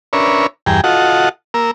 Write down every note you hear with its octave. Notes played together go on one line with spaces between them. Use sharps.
C#4 D4 A#4 B4 C#5 E5
E2 G2 G#4 G5 A#5
F4 F#4 A4 D#5 F#5
A#3 A#4 E6